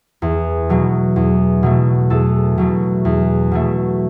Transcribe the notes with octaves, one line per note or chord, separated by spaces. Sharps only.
E2
B2 F#3 A3
E2
B2 F#3 A3
E2 A4
B2 F#3 A3
E2
B2 F#3 A3